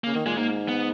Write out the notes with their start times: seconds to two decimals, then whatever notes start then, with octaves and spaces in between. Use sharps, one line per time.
0.04 C#3 A#3
0.15 D#3
0.26 A#2 G#3
0.37 G#2 A#3
0.68 B3